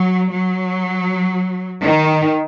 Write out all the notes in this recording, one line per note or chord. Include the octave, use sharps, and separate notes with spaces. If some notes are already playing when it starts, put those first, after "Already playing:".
Already playing: F#3
F#3
D#3